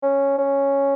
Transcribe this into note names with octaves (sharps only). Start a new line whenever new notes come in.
C#4
C#4